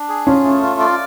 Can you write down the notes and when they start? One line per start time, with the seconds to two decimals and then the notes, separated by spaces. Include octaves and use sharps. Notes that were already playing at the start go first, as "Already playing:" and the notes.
Already playing: D4
0.09 G#4
0.27 C#4 F4
0.44 A3
0.62 F4
0.80 D5